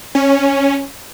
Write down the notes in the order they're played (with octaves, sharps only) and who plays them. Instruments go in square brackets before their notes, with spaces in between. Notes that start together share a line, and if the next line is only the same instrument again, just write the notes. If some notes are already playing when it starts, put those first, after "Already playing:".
[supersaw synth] C#4